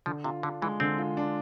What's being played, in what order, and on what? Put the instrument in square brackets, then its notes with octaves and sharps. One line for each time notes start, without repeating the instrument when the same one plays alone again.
[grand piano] D3 [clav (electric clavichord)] F3
[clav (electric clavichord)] C3 [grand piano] F4
[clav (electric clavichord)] D3 [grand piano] D4
[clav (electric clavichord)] E3 [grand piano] G#3
[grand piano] D3 [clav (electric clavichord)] C4
[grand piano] F4
D4